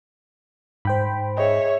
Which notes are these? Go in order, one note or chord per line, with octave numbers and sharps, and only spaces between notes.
G#2 C5 G5 B5
G#4 C#5 D#5 E5